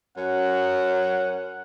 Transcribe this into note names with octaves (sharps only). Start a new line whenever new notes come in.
F#2 C#4 F#5